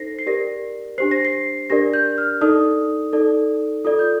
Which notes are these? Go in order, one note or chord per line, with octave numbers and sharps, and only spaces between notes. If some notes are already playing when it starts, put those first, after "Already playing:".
Already playing: D#4 A4 C5 A#6 C7
C7
G4 A#4 D5 A#6
D4 G4 C5 C7
A#6
C7
D4 G4 A#4 D5 A#6
G6
F6
D#4 A4 D5 D#6
D#4 A4 D5
F4 A4 D5 D#6
G6